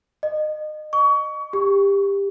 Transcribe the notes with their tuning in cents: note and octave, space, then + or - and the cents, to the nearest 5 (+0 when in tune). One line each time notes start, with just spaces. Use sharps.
D#5 -25
C#6 +30
G4 +20